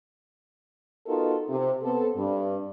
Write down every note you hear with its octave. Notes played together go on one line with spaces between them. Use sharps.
B3 D#4 F4 F#4 A4 A#4
C3
B3 C4 A4
G2